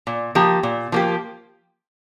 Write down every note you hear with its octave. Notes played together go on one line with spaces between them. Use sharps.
A#2
F3 A#3 G4
A#2
F3 A#3 G4